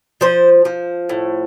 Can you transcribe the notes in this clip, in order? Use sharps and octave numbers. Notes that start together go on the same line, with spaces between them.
F3 C5
F3
A2